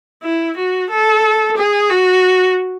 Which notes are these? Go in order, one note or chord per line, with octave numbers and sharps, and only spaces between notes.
E4
F#4
A4
G#4
F#4